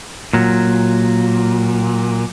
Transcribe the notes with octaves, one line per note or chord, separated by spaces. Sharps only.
A#2 F#3